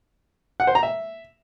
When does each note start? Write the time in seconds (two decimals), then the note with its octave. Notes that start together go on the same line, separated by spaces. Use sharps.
0.60 F#5
0.67 C5
0.75 A#5
0.83 E5